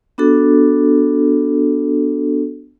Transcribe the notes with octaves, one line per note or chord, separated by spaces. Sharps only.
B3 D4 F#4 A4